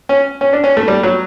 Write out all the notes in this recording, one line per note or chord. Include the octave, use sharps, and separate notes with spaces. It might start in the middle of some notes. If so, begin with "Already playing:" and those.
C#4
C#4
D4
C#4
A3
G3
F#3